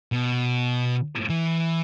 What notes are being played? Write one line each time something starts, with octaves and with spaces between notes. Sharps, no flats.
B2
E3